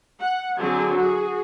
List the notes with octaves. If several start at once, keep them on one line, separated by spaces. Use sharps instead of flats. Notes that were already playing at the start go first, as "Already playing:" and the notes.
F#5
D3 F#3 C4 G#4
F#4 G#4